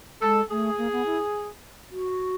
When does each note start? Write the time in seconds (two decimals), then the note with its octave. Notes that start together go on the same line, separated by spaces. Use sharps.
0.22 G#3 A4
0.50 A3 G#4
0.78 A#3
0.93 B3
1.06 E4
1.91 F#4